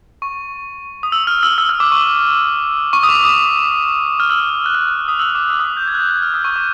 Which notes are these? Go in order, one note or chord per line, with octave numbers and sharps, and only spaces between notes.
C#6
D#6
E6
F6
E6
E6
F6
D6
C#6
C#6
D#6
D6
D#6
F6
E6
F#6
F6
D#6
E6
D6
D6
D#6
D6
G6
G#6
F#6
G6
F#6
F6
D#6
C#6
D6